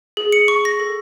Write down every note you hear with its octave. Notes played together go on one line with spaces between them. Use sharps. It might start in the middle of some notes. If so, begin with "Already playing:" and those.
G#4
C#7
C#6
A#6
A4